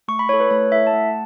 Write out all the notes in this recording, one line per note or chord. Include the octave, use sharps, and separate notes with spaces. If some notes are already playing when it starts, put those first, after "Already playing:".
A3 C#6
B5
E4 A4 C#5
B4
A3 C#5
E4 A4 E5
A5
A3 F#5